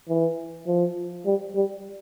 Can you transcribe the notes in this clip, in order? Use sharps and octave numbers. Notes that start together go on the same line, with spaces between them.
E3
F3
G3
G3